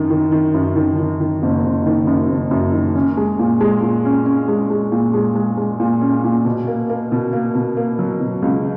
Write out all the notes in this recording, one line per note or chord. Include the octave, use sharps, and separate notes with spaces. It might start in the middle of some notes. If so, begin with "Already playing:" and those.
Already playing: F#2 D#3
D#3
D#3
F#2
D#3
D#3
D#3
F#1
F#1
D#3
F#2
F#1
F#2
D#3
C#4
G#3
A#2
G#3
A#2
C#4
C#4
G#3
G#3
A#2
G#3
G#3
G#3
A#2
C#4
A#2
B2
A#3
A#3
B2
A#3
B2
A#3
F#3
B2
C#2